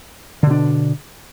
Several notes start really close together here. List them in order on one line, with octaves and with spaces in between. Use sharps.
D3 B2 D4